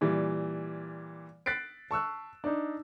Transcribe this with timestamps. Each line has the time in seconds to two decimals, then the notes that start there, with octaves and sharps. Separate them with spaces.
0.01 A#2 E3 G3
1.46 F#6 A6 B6 C7 D7
1.91 A5 C#6 E6 F#6
2.44 D4 D#4